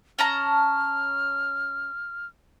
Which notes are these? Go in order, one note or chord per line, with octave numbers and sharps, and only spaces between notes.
C#4 A5 A#5 F6